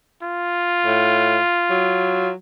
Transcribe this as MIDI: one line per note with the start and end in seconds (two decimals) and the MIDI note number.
0.23 2.31 65
0.85 1.37 45
1.70 2.33 54